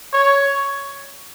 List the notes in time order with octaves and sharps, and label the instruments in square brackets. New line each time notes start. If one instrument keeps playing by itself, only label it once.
[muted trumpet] C#5